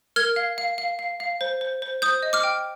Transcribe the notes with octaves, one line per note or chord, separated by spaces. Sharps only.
A#4 F6 G#6
F5
F5
F5
F5
F5
C5
C5
C5
C5 D#6 G6
D#5
D6 F6
G5